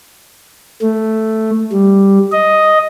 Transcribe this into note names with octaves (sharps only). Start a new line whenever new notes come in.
A3
G3
D#5